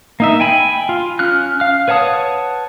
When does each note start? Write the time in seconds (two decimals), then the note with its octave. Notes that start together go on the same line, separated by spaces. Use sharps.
0.20 A#3 D#4 E5
0.40 G5 G#5 B5
0.89 F4
1.19 C#4 F6 F#6
1.60 F5 F6
1.88 B4 C#5 F#5 A5 D#6